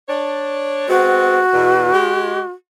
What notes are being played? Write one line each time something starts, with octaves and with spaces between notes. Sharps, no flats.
D4 C#5
G#3 B3 C4 F#4
E2 B2
G#3 G4